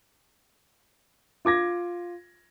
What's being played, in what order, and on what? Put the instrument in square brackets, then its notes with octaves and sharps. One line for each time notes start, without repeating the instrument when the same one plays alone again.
[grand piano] F4 D6 G#6 A#6